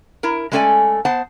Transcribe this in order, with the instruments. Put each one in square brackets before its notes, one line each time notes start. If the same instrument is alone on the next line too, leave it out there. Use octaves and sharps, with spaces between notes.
[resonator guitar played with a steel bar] E4 A#4
G#3 A3 C#4 A4 D5 G#5
B3 C5 F#5 A5